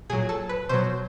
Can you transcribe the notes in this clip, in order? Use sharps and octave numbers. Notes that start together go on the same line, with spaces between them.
A#2 F#3 G#4
A4
B4
B2 F#3 C5